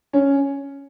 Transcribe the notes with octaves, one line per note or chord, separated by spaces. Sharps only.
C#4